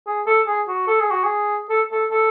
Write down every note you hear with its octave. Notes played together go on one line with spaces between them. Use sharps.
G#4
A4
G#4
F#4
A4
G#4
F#4
G#4
A4
A4
A4